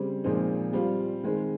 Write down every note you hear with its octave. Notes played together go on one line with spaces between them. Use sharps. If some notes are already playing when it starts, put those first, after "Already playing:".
Already playing: C#3 G3 C4
A#2 F3 G#3 C4 D#4
G3 C4 F4
D#3 G#3 C4